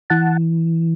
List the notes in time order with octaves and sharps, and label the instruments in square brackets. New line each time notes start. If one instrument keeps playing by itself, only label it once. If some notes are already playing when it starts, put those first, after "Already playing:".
[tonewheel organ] E3 F#5 A5